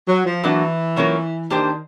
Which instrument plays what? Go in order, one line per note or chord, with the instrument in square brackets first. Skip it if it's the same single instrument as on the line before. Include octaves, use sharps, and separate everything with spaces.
[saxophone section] F#3
F3
[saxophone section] E3 [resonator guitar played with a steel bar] F#3 A#3 D4 F#4
[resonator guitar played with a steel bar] F#3 A#3 C#4 F4 A#4
[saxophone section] D#3 [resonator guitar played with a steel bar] A#3 D4 G4 C5